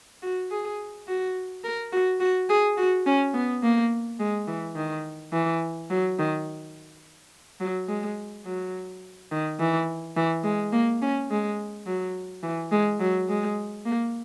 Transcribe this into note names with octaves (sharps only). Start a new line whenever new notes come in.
F#4
G#4
F#4
A#4
F#4
F#4
G#4
F#4
C#4
B3
A#3
G#3
E3
D#3
E3
F#3
D#3
F#3
G#3
F#3
D#3
E3
E3
G#3
A#3
C#4
G#3
F#3
E3
G#3
F#3
G#3
A#3